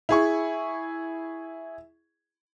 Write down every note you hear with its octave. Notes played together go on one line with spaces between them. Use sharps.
E4 G#4 C#6